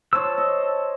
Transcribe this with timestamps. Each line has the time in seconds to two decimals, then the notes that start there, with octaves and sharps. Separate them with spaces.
0.13 C5 C#5 A5 E6
0.38 D#5